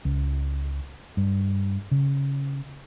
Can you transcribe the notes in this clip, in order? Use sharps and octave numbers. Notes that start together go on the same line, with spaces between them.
C#2
G2
C#3